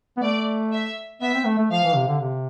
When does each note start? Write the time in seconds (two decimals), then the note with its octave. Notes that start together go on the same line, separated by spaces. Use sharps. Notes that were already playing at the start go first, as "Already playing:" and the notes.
0.17 B3
0.22 A3 D5
0.72 E5
1.21 B3 E5
1.34 C4
1.46 A3
1.58 A3
1.71 F3 F5
1.84 E3
1.96 C3
2.08 D3
2.21 C3